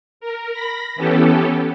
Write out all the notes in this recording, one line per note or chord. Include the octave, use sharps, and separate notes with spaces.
A#4
B5 A#6
E3 B3 C#4 G4 A4